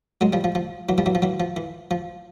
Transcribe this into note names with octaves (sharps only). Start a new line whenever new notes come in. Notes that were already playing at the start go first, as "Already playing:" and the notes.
F#3 G#3
F3 G3
F3
F3
E3 F#3
F3 G3
E3 F#3
F3
E3 F#3
F3
E3
F3